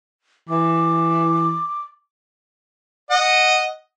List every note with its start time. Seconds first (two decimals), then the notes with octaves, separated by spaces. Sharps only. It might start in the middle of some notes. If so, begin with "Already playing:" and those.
0.49 E3 D6
3.10 D#5 F#5